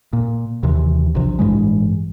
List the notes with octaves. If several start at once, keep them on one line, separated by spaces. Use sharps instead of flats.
A#2
D#2 C3 E3
A#1 C3
A1 G2 E3 G#3